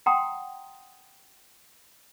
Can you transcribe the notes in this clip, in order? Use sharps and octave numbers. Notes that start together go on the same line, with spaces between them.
F#5 G5 A#5 C6 D#6